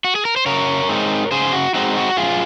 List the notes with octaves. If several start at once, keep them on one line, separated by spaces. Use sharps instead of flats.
F#4
G#4
A#4
C5
C#3 A#4 C#5
G#3 C4 D#4
C#3 G#4 C5
F#4
G#3 C4 D#4 F#4
F#4
F#2 F4 G#4